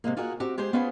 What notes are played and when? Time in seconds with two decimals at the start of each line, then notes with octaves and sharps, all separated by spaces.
0.04 C3 F3 G#3 A#3
0.17 F4 F#4 G#4 A#4 D#5 F#5
0.40 C4 F#4 G4
0.58 G#3 G4 G#4 C5
0.73 B3 C#4 F4 G#4 B4 C5